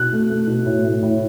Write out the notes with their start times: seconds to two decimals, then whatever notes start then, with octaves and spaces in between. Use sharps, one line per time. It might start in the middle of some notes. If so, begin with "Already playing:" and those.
Already playing: B2 F#6
0.12 A3
0.30 A3
0.47 B2
0.66 A2
0.84 A2
1.03 A2